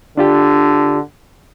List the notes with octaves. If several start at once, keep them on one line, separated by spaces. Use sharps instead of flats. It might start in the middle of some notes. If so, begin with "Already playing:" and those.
D3 D4 F4 G4